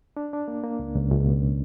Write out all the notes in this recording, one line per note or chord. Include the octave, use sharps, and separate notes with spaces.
D4
D4
A#3
A#3
C#2
C#2
C#2
B2